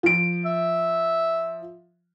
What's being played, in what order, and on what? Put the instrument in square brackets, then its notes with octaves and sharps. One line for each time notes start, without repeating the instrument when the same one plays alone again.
[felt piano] F3 D7
[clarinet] E5